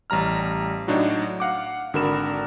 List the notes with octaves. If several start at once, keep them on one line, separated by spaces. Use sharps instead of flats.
A1 G3 A#5 F6
A2 F#3 D4 D#4 F#4
F5 F#5 D6
G#1 D3 F#4 A#4 B5 E7